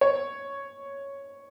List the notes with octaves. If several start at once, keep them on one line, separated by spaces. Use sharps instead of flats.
C#5